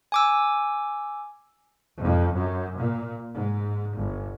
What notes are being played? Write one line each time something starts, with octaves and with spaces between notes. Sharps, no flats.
G#5 D6 E6
F2
F#2
A#2
G#2
G1